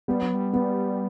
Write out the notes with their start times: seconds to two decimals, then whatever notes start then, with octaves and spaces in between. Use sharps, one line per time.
0.08 G3 B3
0.21 F#3
0.34 G3
0.53 B3